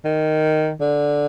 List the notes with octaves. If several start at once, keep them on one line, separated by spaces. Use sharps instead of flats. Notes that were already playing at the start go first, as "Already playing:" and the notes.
D#3
D3